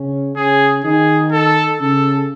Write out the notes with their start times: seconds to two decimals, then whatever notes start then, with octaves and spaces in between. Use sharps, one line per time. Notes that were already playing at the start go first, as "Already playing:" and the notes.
Already playing: C#3 C#4
0.36 C#3 C#4 G#4
0.84 D#3 D#4 G#4
1.32 A4
1.80 C#3 C#4 A4